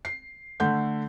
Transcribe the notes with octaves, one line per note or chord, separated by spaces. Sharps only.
C7
D3 A3 G6